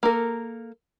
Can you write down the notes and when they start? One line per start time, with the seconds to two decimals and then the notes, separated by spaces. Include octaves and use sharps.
0.03 A#3 A4 A#4